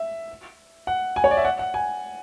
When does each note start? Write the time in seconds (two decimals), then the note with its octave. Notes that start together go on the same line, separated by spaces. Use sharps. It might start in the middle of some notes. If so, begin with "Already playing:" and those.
Already playing: E5
0.87 F#5
1.16 G#5
1.24 C#5
1.31 D5
1.37 E5
1.45 F#5
1.59 F#5
1.74 G#5